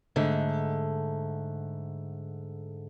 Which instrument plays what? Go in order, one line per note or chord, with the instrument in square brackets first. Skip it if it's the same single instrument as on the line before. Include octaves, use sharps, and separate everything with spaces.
[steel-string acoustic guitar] G#2 D3 A3